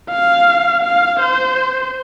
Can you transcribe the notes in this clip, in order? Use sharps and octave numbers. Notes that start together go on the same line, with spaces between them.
F5
F5
C5